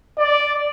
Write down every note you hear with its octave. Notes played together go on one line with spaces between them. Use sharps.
D5